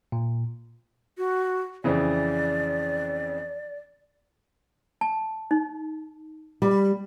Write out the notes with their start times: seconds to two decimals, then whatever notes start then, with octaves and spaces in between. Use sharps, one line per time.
0.12 A#2
1.18 F#4
1.84 F2 C#3 E3 D5
5.01 A5
5.51 D#4
6.62 G3